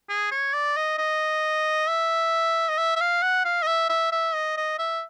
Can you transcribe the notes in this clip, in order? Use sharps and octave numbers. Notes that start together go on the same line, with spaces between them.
G#4
C#5
D5
D#5
D#5
E5
D#5
E5
E5
F5
F#5
F5
D#5
E5
E5
E5
D#5
D#5
E5